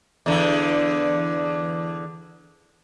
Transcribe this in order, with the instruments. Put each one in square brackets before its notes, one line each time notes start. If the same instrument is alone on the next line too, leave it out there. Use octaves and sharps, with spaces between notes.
[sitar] E2 D3